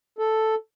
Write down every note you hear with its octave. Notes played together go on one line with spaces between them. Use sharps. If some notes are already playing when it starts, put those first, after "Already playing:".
A4